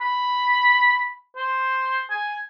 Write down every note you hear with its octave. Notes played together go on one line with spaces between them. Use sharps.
B5
C5
G#5